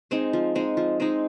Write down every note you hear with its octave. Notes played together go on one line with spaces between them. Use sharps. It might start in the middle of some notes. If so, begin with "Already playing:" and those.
G#3 C4 D#4
F3
G#3 C4 D#4
F3
G#3 C4 D#4